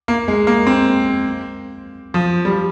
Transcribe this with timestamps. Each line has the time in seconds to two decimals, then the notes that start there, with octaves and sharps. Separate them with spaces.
0.08 A#3
0.28 G#3
0.47 A#3
0.67 C4
2.14 F3
2.45 G3